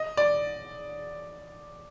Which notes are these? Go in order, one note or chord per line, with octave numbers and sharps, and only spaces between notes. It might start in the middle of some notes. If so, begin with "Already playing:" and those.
Already playing: D#5
D5